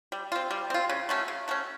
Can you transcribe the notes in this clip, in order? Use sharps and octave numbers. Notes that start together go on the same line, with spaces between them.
G3
C4 F4
G3
C4 F4
C#3
F#3 A3 C#4
C#3
F#3 A3 C#4